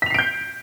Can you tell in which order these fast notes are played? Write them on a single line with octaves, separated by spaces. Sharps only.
B6 F7 C7 D7 G6